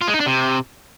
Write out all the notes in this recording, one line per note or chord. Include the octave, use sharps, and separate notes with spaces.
F4
G#3
D#4
D4
C3